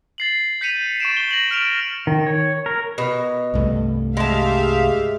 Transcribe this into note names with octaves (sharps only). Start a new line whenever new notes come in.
A6 C7 F#7
G6 B6 C#7 D#7 F7
C#6 A6 D7 E7
G7
A#6 F#7
F6 D7 F7
D#3
C#5
A#4
B2
C2 G2 A3
G#3 G4 E5 F5 A5